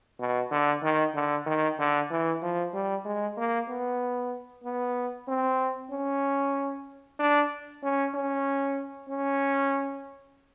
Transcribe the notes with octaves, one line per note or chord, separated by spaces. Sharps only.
B2
D3
D#3
D3
D#3
D3
E3
F3
G3
G#3
A#3
B3
B3
C4
C#4
D4
C#4
C#4
C#4